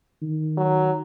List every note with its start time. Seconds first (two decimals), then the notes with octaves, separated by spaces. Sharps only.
0.22 D#3
0.57 F#3